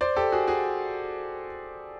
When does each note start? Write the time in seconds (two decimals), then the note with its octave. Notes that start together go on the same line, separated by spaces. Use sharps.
0.01 C5 D5
0.16 G4 A4
0.32 F#4 G#4
0.48 F#4 G#4